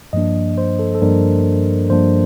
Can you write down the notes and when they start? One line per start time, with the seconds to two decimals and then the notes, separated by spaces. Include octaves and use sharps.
0.13 G2 F3 A#3 D4 D#5
0.58 C5
0.79 A4
0.95 A4
1.02 G2 F3 A#3 D4 A#4
1.90 G2 F3 A#3 D4 C5